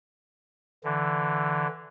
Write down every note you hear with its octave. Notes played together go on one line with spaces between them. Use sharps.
D3 E3